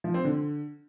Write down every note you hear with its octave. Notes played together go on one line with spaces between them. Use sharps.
F3
C4
D3